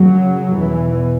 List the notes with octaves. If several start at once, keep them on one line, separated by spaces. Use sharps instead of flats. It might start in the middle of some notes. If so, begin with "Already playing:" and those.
Already playing: F#2 C#3 F#3
E2 B2 E3